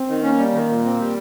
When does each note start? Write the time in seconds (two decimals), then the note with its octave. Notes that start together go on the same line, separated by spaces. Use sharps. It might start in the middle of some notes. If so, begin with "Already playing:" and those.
Already playing: C4
0.08 D#3
0.23 A#3 C#4
0.38 G3
0.53 D#3
0.69 A#2
0.84 C4
1.00 G3